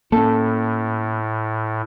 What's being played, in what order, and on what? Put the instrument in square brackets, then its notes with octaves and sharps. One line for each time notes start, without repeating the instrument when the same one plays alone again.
[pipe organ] A2 [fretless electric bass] A#3 C#4 [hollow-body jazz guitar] A4